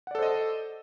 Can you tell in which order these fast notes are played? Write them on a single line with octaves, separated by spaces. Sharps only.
F#5 D5 A4 C5 D#5